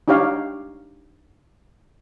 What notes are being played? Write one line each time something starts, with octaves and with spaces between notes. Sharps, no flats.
D4 D#4 G4 C#5 F5